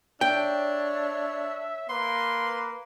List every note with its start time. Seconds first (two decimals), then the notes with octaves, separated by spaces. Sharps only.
0.21 D4 C#5 E5 G5
1.89 A#3 B4 C6